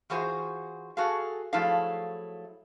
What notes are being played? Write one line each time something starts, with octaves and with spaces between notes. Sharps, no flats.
E3 F4 F#4 G#4 C5
F#4 G#4 A4 F5
F3 F#3 A3 E4 G#4 F5